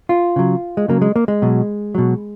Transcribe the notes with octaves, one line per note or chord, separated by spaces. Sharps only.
F4
C#3 F#3
G#3
C#3 F#3 A#3
G#3
A#3
G#3
B2 F#3
B2 F#3